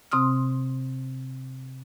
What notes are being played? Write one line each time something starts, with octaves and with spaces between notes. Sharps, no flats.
C3 C4 C6 D#6 F6